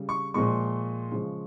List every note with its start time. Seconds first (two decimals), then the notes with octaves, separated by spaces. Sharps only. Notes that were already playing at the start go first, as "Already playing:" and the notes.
Already playing: C#3 G3
0.09 C#6
0.34 A#2 F3 G#3 C#6
1.11 C#3 F3 G#3